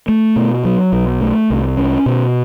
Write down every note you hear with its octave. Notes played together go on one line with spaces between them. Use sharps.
A3
B2
F#3
B1
A3
C2
C#4
B2